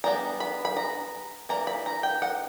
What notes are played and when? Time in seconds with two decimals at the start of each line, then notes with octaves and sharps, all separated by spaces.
0.04 G3 B3 D4 A#5
0.40 B5
0.65 B5
0.77 A#5
1.49 E3 A#3 D4 A#5
1.67 B5
1.86 A#5
2.03 G5
2.22 F#5